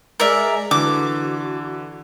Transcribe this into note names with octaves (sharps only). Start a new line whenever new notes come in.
G#3 A#4 D5 E5
D3 E3 F#4 D6